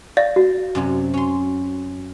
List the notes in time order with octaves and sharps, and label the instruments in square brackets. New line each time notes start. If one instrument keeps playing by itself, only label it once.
[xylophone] D5 F5 A6
[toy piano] F#4
[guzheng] F#2 C3 F#3
C#4 C6